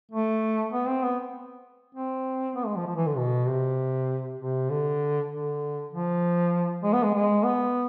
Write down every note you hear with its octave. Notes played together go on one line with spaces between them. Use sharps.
A3
B3
C4
B3
C4
B3
G#3
F3
F3
E3
D3
B2
C3
C3
D3
D3
F3
G#3
B3
G#3
G#3
B3